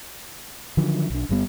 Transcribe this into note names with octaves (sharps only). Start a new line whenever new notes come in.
D3 D#3 F3 F#3
B1 D4
G1 G2 G3 B3